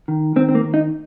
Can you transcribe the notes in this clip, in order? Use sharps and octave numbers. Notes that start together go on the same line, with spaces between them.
D#3
D#3 C4
C4
A#3
D#3
D#4